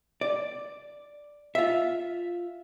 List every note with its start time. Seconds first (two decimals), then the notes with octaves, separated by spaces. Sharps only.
0.21 D5
1.55 F4 E5